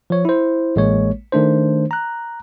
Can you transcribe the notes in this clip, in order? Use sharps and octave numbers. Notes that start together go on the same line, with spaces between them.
F3 C#5
E4 C5
A1 G#3 A#3 C#5
D#3 A3 D4 C5
A#5 F#6